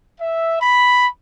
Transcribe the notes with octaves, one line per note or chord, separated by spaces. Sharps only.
E5
B5